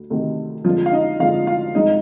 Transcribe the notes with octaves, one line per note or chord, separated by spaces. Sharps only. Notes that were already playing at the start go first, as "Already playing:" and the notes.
Already playing: D2
D2 C3 D#3
F2 D3 F3 G#3 F4
F5
D#4 D#5
F2 D3 G#3 F4 F5
F4 F5
G#1 G#2 F3 G#3 D#4 D#5